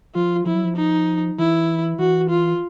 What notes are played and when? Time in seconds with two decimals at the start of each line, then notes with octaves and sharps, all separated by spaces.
0.15 F3 F4
0.46 F3 E4
0.55 F#3
0.64 F3
0.77 D#4
1.38 E3 E4
1.99 E3 F#4
2.30 F4